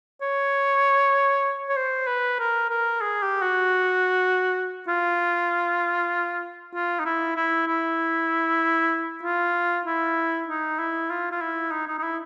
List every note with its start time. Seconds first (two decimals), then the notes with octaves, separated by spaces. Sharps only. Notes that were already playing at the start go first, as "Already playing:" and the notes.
0.22 C#5
1.69 C#5
1.77 C5
2.07 B4
2.40 A#4
2.70 A#4
3.01 G#4
3.22 G4
3.42 F#4
4.88 F4
6.74 F4
7.00 D#4
7.05 E4
7.36 E4
7.68 E4
9.23 F4
9.86 E4
10.48 D#4
10.79 E4
11.10 F4
11.32 F4
11.41 E4
11.72 D#4
11.87 D#4
11.99 D#4
12.03 E4